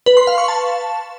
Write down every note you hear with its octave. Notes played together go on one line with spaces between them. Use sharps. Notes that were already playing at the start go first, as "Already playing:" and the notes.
B4
C6
F5
C#6
A5